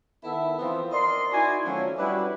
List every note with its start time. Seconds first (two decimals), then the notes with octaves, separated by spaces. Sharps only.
0.24 D#3 B3 E4 A4 E5
0.59 E3 F3 B3 C4
0.91 A#4 D5 D#5 C6
1.32 D#4 E4 F#4 D5 G#5
1.65 D#3 F3 F#3 A3 C#4
1.97 G3 C#4 D4 E4 F#4 B4